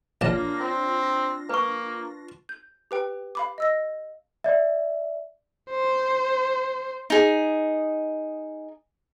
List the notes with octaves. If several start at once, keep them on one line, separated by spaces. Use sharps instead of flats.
A#1 A#3 D4 F4 C#5 A5 A#6
C4
A#3 B4 C#6
G6
G4 B4 G5
F5 B5 D6
D#5 E6 A#6
D5 E5
C5
D#4 G#4